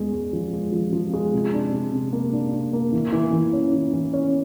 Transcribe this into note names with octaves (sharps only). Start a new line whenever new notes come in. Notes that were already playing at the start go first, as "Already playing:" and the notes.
Already playing: E2 G#3
G#3
F3
G#3
F3
F3
G#3
C3
D4
C3
C3
A#3
D4
D4
A#3
E3
E3
E3
C#4
E3
E3
C#4